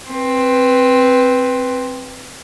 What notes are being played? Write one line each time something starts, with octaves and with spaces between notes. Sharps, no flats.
C4 B4